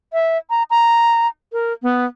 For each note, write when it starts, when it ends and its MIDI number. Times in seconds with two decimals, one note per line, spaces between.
0.13 0.38 76
0.50 0.63 82
0.70 1.27 82
1.53 1.73 70
1.83 2.05 59